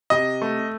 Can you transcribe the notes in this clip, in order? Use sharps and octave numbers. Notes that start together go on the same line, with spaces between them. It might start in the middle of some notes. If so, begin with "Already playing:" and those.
C3 D#5
A3